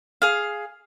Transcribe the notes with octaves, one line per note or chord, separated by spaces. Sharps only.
G#4 F5